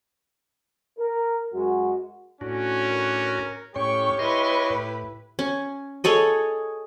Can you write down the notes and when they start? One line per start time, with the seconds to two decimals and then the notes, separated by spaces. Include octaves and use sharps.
0.99 A#4
1.53 F#2 G#3 F#4
2.41 A2 C#4 D4 F#4
2.89 A#4
3.76 A2 C#4 G4 C#5 G5 C#6
4.19 E4 B4 D#5 C6 C#6
4.70 A2
5.39 C#4
6.04 G#4 A4 C#5 D#5